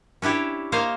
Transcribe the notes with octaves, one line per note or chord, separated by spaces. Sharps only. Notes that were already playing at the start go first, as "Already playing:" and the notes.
C#4 D4 E4 G4 C#5
A#3 C5 C#5 D#5 F5